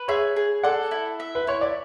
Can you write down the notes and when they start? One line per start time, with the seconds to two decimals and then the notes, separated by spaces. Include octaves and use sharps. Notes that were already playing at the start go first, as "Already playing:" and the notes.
Already playing: B4
0.08 G#4 C#5 E5
0.36 G#4
0.63 A4 D5 F#5
0.91 E4
1.20 E5
1.35 B4
1.47 E4 C#5
1.61 D5